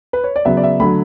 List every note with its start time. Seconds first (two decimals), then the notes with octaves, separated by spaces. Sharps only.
0.13 B4
0.24 C#5
0.36 D5
0.45 C#3 F#3 B3 E5
0.57 D5
0.64 E5
0.80 D3 F#3 A3 B5